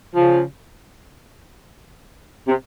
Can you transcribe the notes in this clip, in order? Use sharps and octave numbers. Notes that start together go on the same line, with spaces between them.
C#3 F3
C3